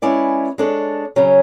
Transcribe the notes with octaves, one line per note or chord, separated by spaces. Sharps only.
G#3 C#4 E4 B4 D5
G#3 D4 A4 C#5
C#3 F#3 C#4